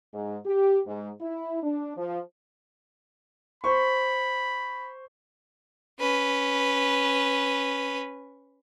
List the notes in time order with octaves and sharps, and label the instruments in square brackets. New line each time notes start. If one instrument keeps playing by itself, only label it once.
[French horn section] G#2
G4
G#2
E4
D4
F3
[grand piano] C5 C#6 [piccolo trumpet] B5
[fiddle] C#4 B4